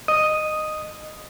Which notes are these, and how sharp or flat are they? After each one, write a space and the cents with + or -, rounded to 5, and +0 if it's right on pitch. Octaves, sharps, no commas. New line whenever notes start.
D#5 -15 D#6 +0